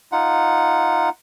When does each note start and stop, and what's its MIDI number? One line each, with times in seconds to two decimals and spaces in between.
0.12 1.09 63
0.12 1.09 65
0.12 1.09 78